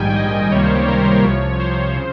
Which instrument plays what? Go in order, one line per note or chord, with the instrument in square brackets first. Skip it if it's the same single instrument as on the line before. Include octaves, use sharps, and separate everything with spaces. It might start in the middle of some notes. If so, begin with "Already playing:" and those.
Already playing: [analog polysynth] A#1 G#2 D#3 G3 G5 G#5
D#5
C#2 C3 D#3 G3 A#3 C#5
C5
G4
A#4
C5
C#5
C2 C3 F3
C5
C#3